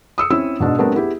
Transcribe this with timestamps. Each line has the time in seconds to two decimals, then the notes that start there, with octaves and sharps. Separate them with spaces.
0.18 D#6 E6 C#7
0.30 C4 C#4 E4 E6
0.60 G#2 B2 D4
0.78 G3 A3 B3 C4 D4 A#4
0.95 B3 E4 G4 G#4